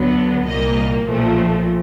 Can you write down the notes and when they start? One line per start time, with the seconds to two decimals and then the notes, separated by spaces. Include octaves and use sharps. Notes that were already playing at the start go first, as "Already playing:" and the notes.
Already playing: D2 D3 F#3 B3
0.45 C2 A#2 G3 A#3 D#5
1.04 B1 A#2 F3 A3